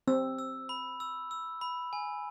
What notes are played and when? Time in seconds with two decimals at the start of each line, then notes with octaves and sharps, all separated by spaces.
0.08 C4 E6
0.39 E6
0.69 B5
1.00 E6
1.31 E6
1.61 B5
1.93 G#5